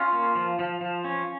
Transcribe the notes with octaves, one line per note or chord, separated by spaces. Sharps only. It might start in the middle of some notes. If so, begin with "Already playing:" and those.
Already playing: C#4 F4
A#3
F3
F3
F3
C#4